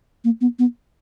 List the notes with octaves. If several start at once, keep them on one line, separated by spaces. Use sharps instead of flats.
A#3
B3
B3